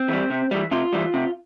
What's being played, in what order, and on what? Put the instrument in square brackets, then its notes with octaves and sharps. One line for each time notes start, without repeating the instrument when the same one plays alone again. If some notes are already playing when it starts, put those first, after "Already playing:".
Already playing: [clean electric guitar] C4
E3 G3
C3
E3 G3
C3 F4
E3 G3
C3